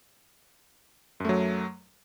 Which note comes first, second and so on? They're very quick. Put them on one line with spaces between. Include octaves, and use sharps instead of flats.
F#2 A3 F#3